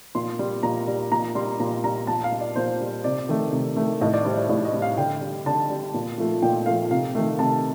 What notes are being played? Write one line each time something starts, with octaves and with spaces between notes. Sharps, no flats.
A#2 C6
G3
A#2 A#5
G3
A#2 A#5
G3 C6
A#2 A#5
G3 A#5
A#2 A5
F5
G3
D5
A#2 C5
G3
C3 D5
D#3 A3
C3
D#3 A3
A2 D#5
D5
G3 C5
D5
A2 D5
D#5
G3
F5
D3 G5
G3
D3 A5
G3
A#2
F3 A3
A#2 G5
F3 A3 F5
C3 F5
D#3 A3
C3 A5